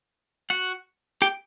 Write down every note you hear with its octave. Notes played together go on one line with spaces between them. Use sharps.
F#4 F#5
G4 G5